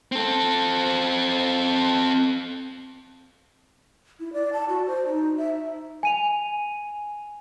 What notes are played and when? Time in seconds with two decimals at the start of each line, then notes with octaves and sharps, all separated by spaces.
0.12 C4 A4
4.20 E4
4.33 D5
4.53 A5
4.69 F#4
4.87 C5
5.07 D#4
5.37 E5
6.03 G#5 D#7 F7